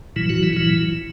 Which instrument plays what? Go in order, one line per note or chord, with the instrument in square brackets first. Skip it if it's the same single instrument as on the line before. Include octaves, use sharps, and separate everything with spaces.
[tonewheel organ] A#2 E3 F#3 E4
F#3 F#4
E3 E4
A#2 E3 F#3 E4